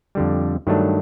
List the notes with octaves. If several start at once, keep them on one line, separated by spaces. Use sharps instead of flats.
F2 D3 G3
G2 D#3 F#3 A3 D4